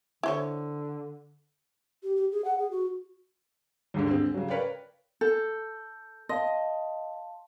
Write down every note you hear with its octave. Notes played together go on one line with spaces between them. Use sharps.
D3 E4 C5 C#5
G4
G4
G#4
F#5
G#4
F#4
D#2 G#2 D3
D3 G#3 C4
C#3 F#3
A#4 B4 C#5 D5 F5 G5
A4 G6
D#5 F5 A5 C6